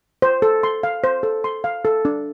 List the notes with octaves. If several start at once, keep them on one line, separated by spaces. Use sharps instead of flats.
C5
A4
C6
F5
C5
A4
C6
F5
A4
D4